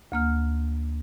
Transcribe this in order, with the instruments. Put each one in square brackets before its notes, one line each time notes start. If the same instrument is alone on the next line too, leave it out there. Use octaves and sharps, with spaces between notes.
[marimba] D2 A#3 F6